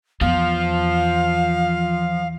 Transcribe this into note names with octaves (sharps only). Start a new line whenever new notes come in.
E2 F3 F5